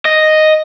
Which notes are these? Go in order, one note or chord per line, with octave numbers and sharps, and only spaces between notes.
D#5